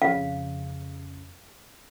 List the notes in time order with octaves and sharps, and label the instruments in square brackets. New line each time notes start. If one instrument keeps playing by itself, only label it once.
[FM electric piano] F2 C#3 [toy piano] F5